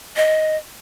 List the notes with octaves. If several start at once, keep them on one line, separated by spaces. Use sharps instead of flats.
D#5